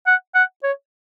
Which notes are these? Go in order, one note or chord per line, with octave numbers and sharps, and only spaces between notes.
F#5
F#5
C#5